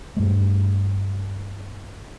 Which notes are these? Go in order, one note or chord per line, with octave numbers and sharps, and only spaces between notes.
G2 G3 A3